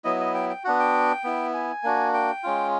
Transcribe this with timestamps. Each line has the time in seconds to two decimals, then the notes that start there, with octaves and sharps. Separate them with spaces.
0.04 F#3 B3 E4 D#5
0.20 D#5
0.34 G5
0.50 G5
0.64 B3 D4 F#4 F#5
0.79 G5
1.24 B3 E4
1.54 G#5
1.83 A#3 D4 F#4
2.14 G5
2.44 G#3 C#4 F4